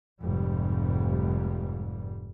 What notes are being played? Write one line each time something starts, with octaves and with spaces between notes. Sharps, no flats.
F1 G#2 G3